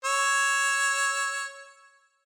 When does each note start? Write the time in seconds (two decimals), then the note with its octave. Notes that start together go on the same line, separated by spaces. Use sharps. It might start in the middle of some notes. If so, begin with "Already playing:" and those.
0.05 C#5 E6